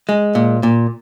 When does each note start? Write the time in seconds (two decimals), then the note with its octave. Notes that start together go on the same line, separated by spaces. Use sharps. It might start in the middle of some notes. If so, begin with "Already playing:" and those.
0.09 G#3
0.35 A#2
0.63 A#2